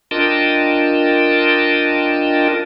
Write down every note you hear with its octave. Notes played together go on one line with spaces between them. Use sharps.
D4 F4 A#4 D#5 G5 A5